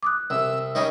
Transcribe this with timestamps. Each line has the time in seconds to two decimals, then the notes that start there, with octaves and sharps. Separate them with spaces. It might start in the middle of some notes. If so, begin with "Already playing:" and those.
0.03 D6 D#6 F#6
0.30 C2 E6
0.75 D#3 G3 C#4 D#5